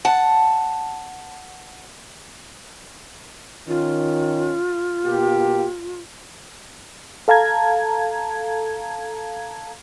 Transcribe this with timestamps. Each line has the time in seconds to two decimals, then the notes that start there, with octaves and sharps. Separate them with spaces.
0.05 F#5 A5
3.68 D#3 C#4 F4
5.06 B2 A#3 G4
7.28 A4 F5 A5 A#5 G#6